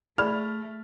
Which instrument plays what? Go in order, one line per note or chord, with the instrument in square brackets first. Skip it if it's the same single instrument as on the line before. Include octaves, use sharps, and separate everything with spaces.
[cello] A3 [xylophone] G#4 D5 B5 [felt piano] F6